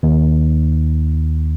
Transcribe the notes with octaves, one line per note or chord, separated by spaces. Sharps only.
D#2